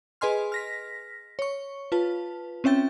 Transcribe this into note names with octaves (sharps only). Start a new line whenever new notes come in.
G#4 B4 D#5 G#5 C6 F6
F6 A#6 B6
C#5 C#6
F4 B4 A5
C4 C#4 E5 G5 A6